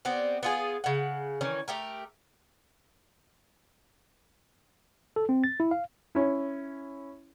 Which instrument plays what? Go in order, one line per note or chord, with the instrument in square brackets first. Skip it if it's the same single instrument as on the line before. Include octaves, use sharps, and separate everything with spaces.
[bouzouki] B3 C4 G4 D5
B3 F4 G#4
C#3 F#5
D#3 E3 C#4
A3 G4 A#4
[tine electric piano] A4
C4
A6
E4
F5
[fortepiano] C#4 E4